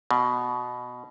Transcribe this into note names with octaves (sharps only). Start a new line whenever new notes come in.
B2